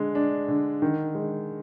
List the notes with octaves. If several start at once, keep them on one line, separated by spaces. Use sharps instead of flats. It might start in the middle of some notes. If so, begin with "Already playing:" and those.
Already playing: D3 G#3
D4
D3
D#3
G#3